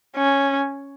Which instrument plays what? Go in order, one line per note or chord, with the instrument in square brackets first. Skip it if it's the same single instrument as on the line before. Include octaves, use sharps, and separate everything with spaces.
[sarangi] C#4